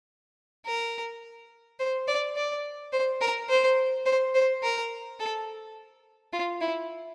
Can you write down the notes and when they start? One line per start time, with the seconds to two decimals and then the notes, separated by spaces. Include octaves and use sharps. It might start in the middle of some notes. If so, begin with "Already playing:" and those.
0.66 A#4
1.79 C5
2.08 D5
2.36 D5
2.93 C5
3.21 A#4
3.49 C5
4.06 C5
4.34 C5
4.63 A#4
5.19 A4
6.33 F4
6.61 E4